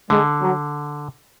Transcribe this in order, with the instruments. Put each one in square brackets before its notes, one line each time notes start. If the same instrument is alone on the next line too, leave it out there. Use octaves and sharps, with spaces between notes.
[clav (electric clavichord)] D3 [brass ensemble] G#3
[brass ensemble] F#3